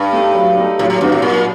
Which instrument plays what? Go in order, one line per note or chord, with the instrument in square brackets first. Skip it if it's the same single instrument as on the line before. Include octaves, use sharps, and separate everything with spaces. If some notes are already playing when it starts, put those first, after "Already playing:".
Already playing: [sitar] G2
[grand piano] A3 D#4
F#3
A3 D#4
[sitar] A2 [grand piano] F#3
[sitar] A2
[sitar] G2 [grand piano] C4 D#4 F#4
[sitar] A2
[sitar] A#2 [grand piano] F#3